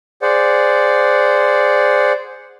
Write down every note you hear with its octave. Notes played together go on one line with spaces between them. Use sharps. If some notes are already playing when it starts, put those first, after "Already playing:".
G#4 C5 D5 F#5